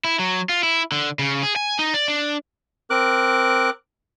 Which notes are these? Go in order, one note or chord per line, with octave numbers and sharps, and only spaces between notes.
E4
F#3
F4
E4
D3
C#3
G#4
G#5
D#4
D5
D4
C4 A#4 D6 F#6